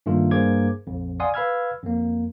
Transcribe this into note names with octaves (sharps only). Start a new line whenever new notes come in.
G2 D#3 A3 A#3 F4
G2 A#3 G#4 C5 D6 G#6
A#1 F2
D5 F5 F#5 G#5 C6 D#6
B4 F5 B5 E6 F6 G#6
F2 A#3